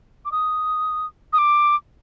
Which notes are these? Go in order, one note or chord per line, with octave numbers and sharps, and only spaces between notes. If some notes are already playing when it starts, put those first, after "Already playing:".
D6
D#6
D#6
D6